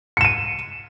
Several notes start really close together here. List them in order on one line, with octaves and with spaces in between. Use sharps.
C#7 E7 D#7